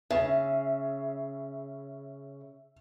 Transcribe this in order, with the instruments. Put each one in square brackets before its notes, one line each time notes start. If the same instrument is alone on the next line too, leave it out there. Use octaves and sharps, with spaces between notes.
[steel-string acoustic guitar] C#3 [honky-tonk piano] E5